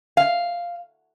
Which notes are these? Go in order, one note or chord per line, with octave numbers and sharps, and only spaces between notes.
F5